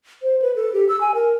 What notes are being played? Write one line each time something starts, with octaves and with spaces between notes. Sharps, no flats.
C5
B4
A4
G4
E6
G#5
A#4